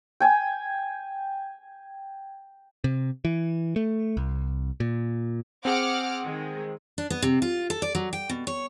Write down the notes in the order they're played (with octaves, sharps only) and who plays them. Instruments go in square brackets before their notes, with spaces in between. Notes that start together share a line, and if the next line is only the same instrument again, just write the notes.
[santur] G5 G#5
[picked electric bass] C3
E3
A3
C2
A#2
[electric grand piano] C4 G#4 [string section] F#5 D6 F6
[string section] D#3 G#3
[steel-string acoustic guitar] D4
B3
C3
F4
A4
D5
F#3
G5
B2
C#5